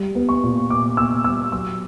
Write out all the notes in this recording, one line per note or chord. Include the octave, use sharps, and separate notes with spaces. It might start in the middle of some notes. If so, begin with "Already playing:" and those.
Already playing: G3
B3
C#6
A#2
B3 D6
B3 E6
G3 E6
F#3 E6